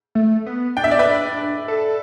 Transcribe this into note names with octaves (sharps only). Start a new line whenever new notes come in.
A3
B3
D4 G5
E5
D5
B4 E5
A4